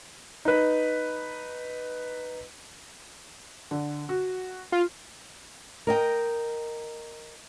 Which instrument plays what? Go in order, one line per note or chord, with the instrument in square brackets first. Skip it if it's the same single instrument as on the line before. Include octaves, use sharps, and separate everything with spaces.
[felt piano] D#4 B4
[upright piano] D3
F#4
[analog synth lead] F4
[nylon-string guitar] A#4 D#5 G5